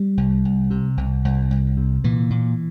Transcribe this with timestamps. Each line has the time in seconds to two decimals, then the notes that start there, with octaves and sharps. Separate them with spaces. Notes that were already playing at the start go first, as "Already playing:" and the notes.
Already playing: G3
0.17 C2
0.45 C2
0.70 C3
0.97 C2
1.25 C2
1.51 C2
1.77 C3
2.04 A#2 E3
2.30 A#2